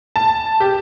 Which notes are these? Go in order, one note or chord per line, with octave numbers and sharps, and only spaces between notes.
A5
G4